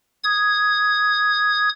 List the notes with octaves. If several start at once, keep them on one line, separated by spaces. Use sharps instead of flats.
D#6 G#6